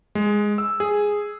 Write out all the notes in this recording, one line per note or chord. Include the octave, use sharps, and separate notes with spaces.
G#3
E6
G#4